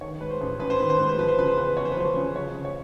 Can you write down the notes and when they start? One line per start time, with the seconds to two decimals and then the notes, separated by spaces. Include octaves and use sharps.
0.01 D#3 C#5
0.21 G#2 B4
0.31 C5
0.41 A1
0.60 A1 B4
0.70 C5
0.80 D#3 B4
0.90 C5
0.99 G#2 B4
1.09 C5
1.18 F3 B4
1.28 C5
1.38 C#3 B4
1.48 C5
1.57 E2 B4
1.76 E2 C#5
1.85 C5
1.92 B4
1.97 F3 C5
2.16 C#3
2.35 F3 C#5
2.54 C#3
2.65 C#5